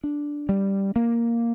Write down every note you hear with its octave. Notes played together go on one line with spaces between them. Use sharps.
D4
G3
A#3